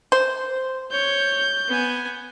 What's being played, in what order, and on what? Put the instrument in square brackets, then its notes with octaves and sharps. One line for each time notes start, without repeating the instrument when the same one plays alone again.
[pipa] C5
[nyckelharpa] C#5 [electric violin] G6
[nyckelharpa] B3 G#5